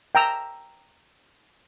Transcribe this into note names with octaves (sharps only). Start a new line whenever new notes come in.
G5 A#5 E6